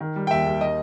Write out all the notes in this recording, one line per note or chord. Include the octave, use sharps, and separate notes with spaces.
D#3
G3
G5
D#2 E5
D#2
D#3 D#5